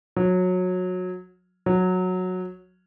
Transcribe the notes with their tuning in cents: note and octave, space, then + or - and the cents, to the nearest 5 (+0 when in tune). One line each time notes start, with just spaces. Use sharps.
F#3 -20
F#3 -10